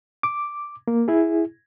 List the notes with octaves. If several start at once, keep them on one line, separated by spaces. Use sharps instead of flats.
D6
A#3
E4 G#4